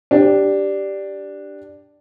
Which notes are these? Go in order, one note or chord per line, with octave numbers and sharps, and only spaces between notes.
D4 G4